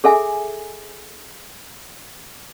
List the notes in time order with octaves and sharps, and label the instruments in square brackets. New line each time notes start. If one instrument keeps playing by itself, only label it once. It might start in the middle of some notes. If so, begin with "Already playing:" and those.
[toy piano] G#4 A4 E5 G#5